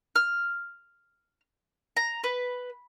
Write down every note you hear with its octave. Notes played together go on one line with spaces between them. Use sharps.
F6
A#5
B4